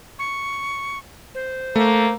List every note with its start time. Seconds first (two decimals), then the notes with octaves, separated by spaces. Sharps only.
0.19 C#6
1.35 C5
1.76 A3 A#3